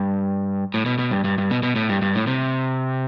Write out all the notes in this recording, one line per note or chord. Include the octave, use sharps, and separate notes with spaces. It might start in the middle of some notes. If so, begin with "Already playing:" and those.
Already playing: G2
A2
B2
B2
G2
G2
G2
B2
B2
A2
G2
G2
A2
C3